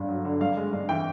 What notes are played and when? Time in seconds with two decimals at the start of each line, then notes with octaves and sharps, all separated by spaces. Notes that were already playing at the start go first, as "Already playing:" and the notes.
Already playing: G1 G2
0.09 F#3
0.25 D3
0.41 G2 F5
0.57 G#3
0.73 G2
0.89 E3 G5